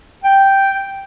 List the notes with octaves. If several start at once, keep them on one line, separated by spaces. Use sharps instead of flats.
G5